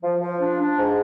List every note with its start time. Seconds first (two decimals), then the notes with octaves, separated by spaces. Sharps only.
0.02 F3
0.21 F3
0.40 D4
0.59 D4
0.77 G#2